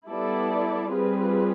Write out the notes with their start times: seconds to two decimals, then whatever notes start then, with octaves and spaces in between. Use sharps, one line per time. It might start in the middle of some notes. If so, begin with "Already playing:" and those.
0.08 G3 B3 E4 A4 D5
0.92 G3 C4 F4 G#4 B4